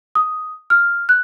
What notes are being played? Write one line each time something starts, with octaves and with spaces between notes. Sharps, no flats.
D#6
F6
F#6